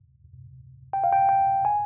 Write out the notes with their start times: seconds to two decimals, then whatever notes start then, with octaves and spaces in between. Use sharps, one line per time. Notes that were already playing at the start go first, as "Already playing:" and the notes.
0.93 G5
1.04 F5
1.13 G5
1.29 G5
1.65 G#5